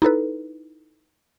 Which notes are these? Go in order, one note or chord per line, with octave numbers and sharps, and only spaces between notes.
D#4 E4 A4 B4